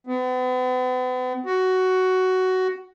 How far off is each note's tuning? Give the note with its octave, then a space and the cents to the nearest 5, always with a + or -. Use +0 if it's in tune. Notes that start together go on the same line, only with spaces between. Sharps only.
B3 +40
F#4 +10